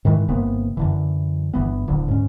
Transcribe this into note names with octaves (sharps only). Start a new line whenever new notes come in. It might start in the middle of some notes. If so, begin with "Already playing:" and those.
G#2 D#3 E3 G#3
G1 C3 A#3 B3
F#2 D3 E3
G1 E3 B3
D1 D3
G#2 C#4